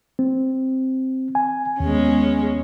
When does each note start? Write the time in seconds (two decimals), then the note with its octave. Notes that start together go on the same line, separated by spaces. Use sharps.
0.19 C4
1.35 G#5
1.80 D#2 G#3 B3 C#4